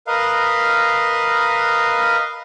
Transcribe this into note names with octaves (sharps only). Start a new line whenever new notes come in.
A#4 B4 D#5 F5